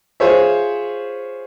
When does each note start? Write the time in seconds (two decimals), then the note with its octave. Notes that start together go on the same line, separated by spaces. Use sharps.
0.20 F4 G#4 C5 C#5 E5